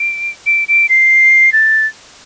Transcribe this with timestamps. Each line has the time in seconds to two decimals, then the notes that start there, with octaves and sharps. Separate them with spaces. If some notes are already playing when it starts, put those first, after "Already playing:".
Already playing: D7
0.46 D7
0.68 D7
0.89 C7
1.53 A6